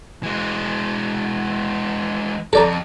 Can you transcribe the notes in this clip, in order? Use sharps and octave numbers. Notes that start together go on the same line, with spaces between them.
E3 G#3
F2 A4 D5 A#5